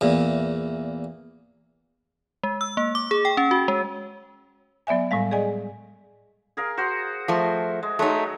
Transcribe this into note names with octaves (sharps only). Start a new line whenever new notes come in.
E2 A#2
G#3
E6
A#3
D6
G#4
G5
C#4
F#4
G#3
F#3 B3 D5 E5 G#5
A2 G3 G#3 F5
G#4 D5 D#5 G#5
G#4 A#4 F5
F#4 C5
F3 A3
G#3
F#3 G#3 A3 D#4